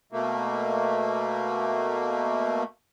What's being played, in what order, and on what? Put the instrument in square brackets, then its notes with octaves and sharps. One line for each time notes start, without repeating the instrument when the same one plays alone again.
[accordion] B2 A3 A#3